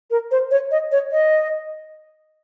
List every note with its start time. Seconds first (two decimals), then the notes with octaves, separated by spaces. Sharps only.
0.11 A#4
0.31 C5
0.51 C#5
0.71 D#5
0.92 C#5
1.12 D#5